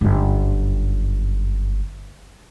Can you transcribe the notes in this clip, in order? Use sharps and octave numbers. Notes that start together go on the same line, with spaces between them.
G1 F#2